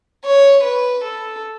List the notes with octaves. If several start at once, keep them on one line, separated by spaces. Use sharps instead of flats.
C#5
B4
A4